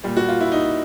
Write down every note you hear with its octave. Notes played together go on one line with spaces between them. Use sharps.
A#2 G3 A#3
F#4
F4
E4
D#4